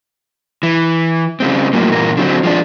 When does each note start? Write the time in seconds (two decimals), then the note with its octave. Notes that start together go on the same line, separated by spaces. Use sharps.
0.63 E3
1.40 C#3 G#3 C4
1.73 A2 F#3 A#3
1.92 G2 A#2 E3 A#4
2.17 D3 F#3 C4
2.43 F3 G#3 D4